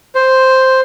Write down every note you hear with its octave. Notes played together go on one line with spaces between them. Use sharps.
C5